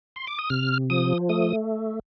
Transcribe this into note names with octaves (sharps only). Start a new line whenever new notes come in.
C6
D6
D#6
C3 F6
F3 D#6
A3 D#6